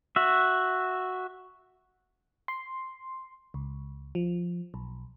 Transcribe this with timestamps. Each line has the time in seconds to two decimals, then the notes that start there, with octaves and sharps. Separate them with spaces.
0.16 F#4 E5
2.48 C6
3.54 C#2
4.15 F3
4.74 B1